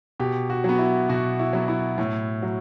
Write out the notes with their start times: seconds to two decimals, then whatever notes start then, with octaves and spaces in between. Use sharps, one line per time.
0.20 B2 G4
0.50 F#4
0.64 F#3 B3
0.79 E4
1.09 B2 F#4
1.39 E4
1.53 F#3 B3
1.68 E4
1.98 A2
2.43 F#3